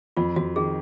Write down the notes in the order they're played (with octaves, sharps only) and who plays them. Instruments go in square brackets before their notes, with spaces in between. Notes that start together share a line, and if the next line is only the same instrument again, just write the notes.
[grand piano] F2 [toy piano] F4
[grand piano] F2 [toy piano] F#4
[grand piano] D#3 [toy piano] G#4